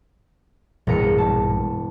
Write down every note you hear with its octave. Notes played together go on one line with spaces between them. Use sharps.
E1 A#1 G2 G#3 A#4 C#7
A5